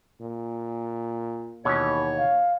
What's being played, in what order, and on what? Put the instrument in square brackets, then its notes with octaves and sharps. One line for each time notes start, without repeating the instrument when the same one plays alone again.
[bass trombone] A#2
[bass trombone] D#2 [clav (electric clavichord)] B2 E3 C#4 [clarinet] C#5
[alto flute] F5